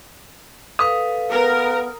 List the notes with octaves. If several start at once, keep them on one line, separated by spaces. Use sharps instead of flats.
A4 B4 F5 D#6
B3 A#4